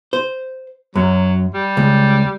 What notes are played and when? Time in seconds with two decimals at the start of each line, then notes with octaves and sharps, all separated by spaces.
0.13 C5
0.95 F#2 F#3
1.54 G3
1.77 C#2